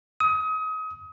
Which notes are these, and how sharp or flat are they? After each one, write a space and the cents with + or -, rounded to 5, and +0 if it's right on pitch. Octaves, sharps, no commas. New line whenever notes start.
D#6 +30